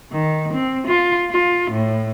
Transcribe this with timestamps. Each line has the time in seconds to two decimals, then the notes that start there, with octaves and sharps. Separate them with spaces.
0.12 D#3
0.53 C4
0.87 F4
1.30 F4
1.71 A2